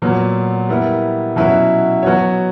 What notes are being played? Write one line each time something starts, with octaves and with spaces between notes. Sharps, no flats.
A#2 F#3 B3
G3 B3 E4 A#4
B2 F#3 C#4 E4 B4
F#3 B3 F#4 C#5